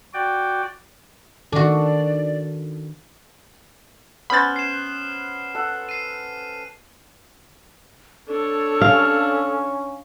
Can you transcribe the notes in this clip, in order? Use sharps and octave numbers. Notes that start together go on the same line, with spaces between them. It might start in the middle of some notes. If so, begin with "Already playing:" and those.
F#4 D5 G5
D#3 D4 F#4 A4 D5
B3 C#4 C5 B5 F6 F#6 A6 F#7
C7 E7
A4 F#5
C7 D#7
D4 A4 C#5
C#4 F5